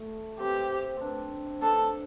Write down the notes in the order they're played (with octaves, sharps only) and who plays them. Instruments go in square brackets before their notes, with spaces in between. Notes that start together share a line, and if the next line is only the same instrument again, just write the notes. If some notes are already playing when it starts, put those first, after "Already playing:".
Already playing: [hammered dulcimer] A3
[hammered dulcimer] C4 [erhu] G4
[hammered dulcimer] C4 D4
[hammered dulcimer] D4 [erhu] A4